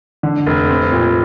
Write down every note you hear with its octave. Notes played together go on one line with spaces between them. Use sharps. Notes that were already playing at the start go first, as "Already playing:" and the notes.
D3
F1
C4
A#2